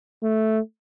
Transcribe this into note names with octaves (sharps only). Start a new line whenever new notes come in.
A3